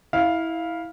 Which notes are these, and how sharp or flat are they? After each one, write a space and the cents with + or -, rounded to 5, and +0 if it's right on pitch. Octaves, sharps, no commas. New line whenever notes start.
E4 -15 F5 +0